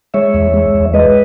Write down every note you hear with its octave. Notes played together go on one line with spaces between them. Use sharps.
G#3 C#5 E5
E2
G#3
E2
G#3 B4 D#5